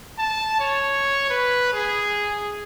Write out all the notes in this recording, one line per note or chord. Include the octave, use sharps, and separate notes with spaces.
A5
C#5
B4
G#4